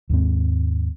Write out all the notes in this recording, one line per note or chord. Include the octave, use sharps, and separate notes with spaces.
D#2 G#2 C4